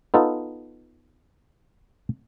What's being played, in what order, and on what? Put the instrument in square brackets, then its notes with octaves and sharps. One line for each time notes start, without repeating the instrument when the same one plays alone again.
[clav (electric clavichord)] B3 D#4 F4 A4